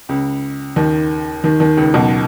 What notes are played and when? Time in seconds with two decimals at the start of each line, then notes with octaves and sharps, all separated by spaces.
0.09 C#2 C#3
0.76 D#2 D#3
1.44 D#2 D#3
1.60 D#2 D#3
1.77 C#2 C#3
1.94 B1 B2